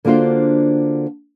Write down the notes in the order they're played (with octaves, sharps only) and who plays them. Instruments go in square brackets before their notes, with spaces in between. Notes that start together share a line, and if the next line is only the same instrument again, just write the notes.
[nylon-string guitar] D3 A#3 D4 F4 F#4 C5